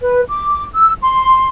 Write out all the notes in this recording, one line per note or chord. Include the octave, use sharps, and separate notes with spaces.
B4
D6
E6
C6